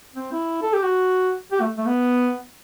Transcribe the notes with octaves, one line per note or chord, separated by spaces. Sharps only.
C4
E4
A4
G4
F#4
G4
A3
A3
B3